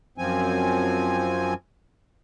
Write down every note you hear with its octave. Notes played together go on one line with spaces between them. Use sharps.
F#2 F3 C4 G#5